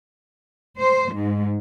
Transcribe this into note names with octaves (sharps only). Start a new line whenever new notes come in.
C5
G#2